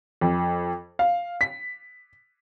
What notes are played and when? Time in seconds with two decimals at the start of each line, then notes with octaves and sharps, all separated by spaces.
0.21 F2
0.99 F5
1.41 B6